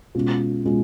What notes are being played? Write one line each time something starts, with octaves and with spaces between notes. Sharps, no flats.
B2 G#3 C#4 F4
B2 G#3 C#4 F4